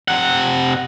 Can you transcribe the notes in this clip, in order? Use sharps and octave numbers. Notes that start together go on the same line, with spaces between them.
C3 F#5